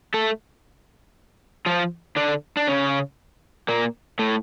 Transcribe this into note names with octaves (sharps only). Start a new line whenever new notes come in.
A3 A4
F3 F4
D3 D4
D4
C#3 C#4
A#2 A#3
A2 A3